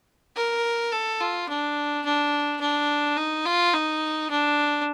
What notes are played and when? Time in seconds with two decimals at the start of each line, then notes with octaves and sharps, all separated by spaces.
0.36 A#4
0.92 A4
1.21 F4
1.49 D4
2.05 D4
2.61 D4
3.17 D#4
3.46 F4
3.74 D#4
4.30 D4